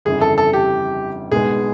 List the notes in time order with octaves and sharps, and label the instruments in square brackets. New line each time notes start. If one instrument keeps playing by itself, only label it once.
[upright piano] G1 F2 C#3 E3 [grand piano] G#4
[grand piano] A4
A4
G4
[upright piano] B1 B2 G#3 B3 [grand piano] G#4